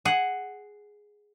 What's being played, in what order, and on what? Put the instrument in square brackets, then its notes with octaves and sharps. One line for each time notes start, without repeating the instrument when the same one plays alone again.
[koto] G#4 F#5